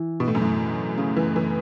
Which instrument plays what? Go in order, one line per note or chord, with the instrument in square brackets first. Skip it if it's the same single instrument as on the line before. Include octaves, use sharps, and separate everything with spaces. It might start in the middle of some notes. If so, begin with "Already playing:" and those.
Already playing: [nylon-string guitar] E3
[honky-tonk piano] B2
A2
F#2
A2
C#3
E3
E3